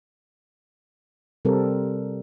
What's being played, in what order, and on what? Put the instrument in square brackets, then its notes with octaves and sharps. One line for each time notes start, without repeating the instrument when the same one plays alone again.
[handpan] C3 G3 C4 A4 A#4